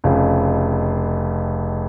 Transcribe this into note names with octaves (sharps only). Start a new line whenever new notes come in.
F1 F2 C#3